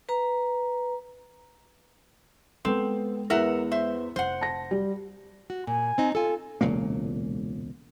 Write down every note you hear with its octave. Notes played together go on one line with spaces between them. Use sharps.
B4 A#5
G#3 B3 C4 A4
E2 B3 A#4 E5 F#5
C5 E5
F1 C5 F#5
A5 A#6
G3
F#4
A#2 G#5
C4 D#4
F4 A4 G#5
E1 C#2 A#2 A#3